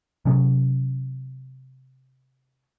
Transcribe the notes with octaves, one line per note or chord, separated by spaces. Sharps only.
C3 F#3 C#4